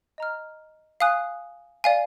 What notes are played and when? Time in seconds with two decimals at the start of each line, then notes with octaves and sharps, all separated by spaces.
0.18 D#5 A#5 F6
1.00 F5 G#5 D#6 F#6
1.84 D5 F5 G#5